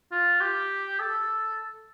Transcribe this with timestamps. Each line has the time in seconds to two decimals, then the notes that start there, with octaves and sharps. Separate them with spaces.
0.12 F4
0.41 G4
0.99 A4